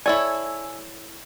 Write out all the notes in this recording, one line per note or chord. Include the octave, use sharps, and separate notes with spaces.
E4 A4 C#5 D5 G#5 E6